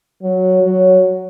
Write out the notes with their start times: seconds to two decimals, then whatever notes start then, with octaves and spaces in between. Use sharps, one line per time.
0.23 F#3
0.63 F#3